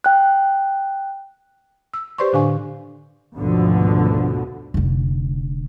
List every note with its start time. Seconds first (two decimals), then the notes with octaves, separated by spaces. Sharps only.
0.04 G5 F#6
1.94 E6
2.18 G4 B4 C5 D5 C6 C#6
2.33 A2 D3 D4 F5 G#5 C#6
3.37 G#1 D2 B2 D3 F3
4.74 F1 D3